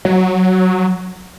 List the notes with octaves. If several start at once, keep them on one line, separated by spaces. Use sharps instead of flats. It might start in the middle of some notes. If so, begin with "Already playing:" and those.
F#3